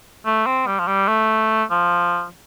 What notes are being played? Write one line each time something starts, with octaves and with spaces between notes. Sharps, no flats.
A3
C4
G3
F3
G3
A3
F3